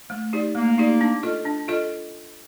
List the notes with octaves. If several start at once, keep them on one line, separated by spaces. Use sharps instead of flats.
A3
D#4 G4 D5
A3 A#3
D#4 G4 D5
D4
F4 A4 D#5
D4
F4 A4 D#5